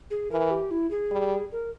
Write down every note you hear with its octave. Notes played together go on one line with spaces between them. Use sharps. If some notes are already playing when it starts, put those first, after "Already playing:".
G#4
E3 A#4
G4
E4
G#4
G3
A#4